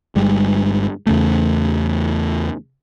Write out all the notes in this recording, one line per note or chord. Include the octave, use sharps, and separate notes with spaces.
G1 G2 G3 G#3
E2 C#3 A3